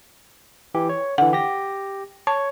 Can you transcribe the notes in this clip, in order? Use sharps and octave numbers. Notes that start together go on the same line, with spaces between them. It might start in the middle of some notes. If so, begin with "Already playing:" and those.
E3 G4
C#5
D3 E3 F#5
G4 A#6
C#5 A5